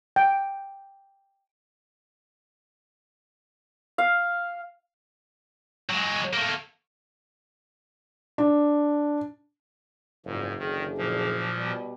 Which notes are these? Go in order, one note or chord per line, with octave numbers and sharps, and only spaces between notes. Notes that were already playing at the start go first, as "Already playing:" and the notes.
G5
F5
F#3 G#3
A3 A#3
D4
F#1 E2 G#2 F3 G3
D3 D#3 D4 G#4
A#2 F3
B2 G3